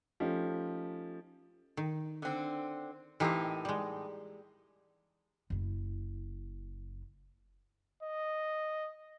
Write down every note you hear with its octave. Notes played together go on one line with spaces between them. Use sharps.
F3 A3 C#4 D#4 G4
D#3
D3 C4
A2 E3 A#3 C4 D#4 G4
G3 G#3
F#1 E4
D#5